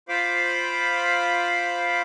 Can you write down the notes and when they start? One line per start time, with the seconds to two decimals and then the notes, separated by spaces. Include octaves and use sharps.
0.09 F4 C5 F5 B5 D6